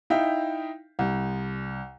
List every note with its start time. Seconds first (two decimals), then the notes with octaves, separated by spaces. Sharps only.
0.10 D#4 E4 E5 F5 G5
0.99 C2